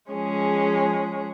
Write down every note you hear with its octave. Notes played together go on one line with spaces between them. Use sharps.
F3 G#3 C#4 G#4